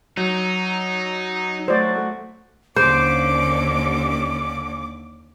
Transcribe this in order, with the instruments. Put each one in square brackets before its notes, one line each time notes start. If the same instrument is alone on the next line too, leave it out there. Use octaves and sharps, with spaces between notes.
[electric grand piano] F#3 [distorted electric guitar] D#4
[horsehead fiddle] A3 F#4 [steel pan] C5 D5
[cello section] D#2 D3 C#4 [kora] C5 [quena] D6